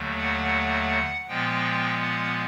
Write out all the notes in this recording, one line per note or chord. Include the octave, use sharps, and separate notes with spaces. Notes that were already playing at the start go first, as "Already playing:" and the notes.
Already playing: D#2 D3 F#3 A3
F#5
A#2 F3 G#3 B3 G5
F#5